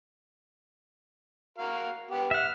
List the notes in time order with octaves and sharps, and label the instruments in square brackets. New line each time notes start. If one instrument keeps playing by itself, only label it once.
[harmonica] F#4 A#4 F5
B3 G4
[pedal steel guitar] E5 F#5 [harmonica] F6